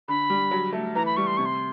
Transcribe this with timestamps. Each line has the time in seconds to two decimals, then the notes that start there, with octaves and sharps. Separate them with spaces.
0.08 D3 B5
0.30 G3
0.51 F#3
0.73 A3
0.95 E3 A#5
1.06 B5
1.17 G3 C#6
1.27 C6
1.37 C3 C#6
1.45 C6